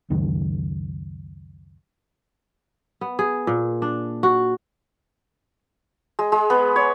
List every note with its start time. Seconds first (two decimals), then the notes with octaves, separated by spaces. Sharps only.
0.10 C#2 F#2 D#3
3.01 B3
3.19 G#4
3.47 A#2
3.82 D4
4.23 F#4
6.19 G#3
6.32 G#3
6.50 B3
6.76 C#5